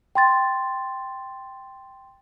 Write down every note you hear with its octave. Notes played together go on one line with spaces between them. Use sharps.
G5 C6 A6